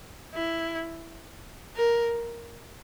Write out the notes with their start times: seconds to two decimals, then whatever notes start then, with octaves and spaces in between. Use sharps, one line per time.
0.34 E4
1.75 A#4